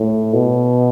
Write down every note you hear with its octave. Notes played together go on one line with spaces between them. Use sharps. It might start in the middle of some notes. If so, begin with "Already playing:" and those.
Already playing: A2
B2